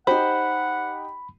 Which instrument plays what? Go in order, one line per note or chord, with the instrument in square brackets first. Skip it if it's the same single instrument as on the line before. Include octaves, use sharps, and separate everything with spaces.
[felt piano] D#4 G4 [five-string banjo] C5 [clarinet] F#5 [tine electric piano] B5